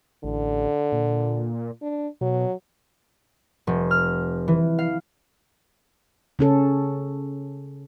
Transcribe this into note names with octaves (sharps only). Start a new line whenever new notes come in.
A1 D3
A#2
D4
B2 F#3
F1
F6
E3
F5
C#3 C#4 A4